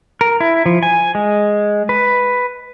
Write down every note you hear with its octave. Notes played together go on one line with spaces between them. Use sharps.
A#4
E4
F3
G#5
G#3
B4